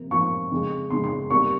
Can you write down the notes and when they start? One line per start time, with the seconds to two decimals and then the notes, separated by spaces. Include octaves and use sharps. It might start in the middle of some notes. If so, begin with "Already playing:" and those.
Already playing: C3 F3 A#3
0.11 C3 F3 A#3 C#6
0.51 F2 C#3 G#3
0.90 F2 C#3 G#3 C6
1.04 C6
1.30 C3 G3 A#3 C#6